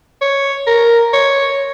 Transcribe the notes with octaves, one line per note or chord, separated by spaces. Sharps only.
C#5
A#4
C#5